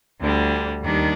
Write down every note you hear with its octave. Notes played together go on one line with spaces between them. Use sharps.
D2 D3 G3
D#2 D#3 G3 D4